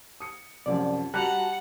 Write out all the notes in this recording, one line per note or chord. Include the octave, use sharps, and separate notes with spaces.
D#6 C#7
C2 F#2 F3 D5
G3 F#4 F#5 A5 A#5 F#6 F7 F#7